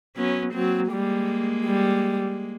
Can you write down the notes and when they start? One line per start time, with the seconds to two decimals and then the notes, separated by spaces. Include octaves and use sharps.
0.17 F#3 B3 C#4
0.53 F#3 A#3 C4
0.91 G3 G#3 A#3
1.65 G3